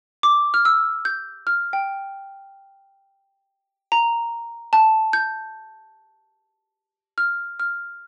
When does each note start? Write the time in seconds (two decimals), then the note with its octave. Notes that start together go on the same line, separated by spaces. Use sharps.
0.23 D6
0.54 F6
0.65 E6
1.05 G6
1.47 F6
1.73 G5
3.92 A#5
4.73 A5
5.13 G6
7.18 F6
7.60 F6